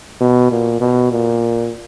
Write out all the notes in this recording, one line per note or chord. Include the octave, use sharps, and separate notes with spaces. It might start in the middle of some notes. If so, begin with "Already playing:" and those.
B2
A#2
B2
A#2